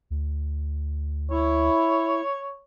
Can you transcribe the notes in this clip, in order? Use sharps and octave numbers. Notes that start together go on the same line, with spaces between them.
D2
E4 C#5